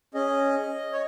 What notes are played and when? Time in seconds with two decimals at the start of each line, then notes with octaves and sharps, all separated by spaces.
0.14 C#4 G#4 D#5
0.93 C#5